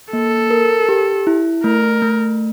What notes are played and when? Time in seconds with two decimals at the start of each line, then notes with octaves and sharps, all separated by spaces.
0.13 A#3 A4
0.51 A#4
0.89 G4
1.27 E4
1.64 A3 A#4
2.02 A3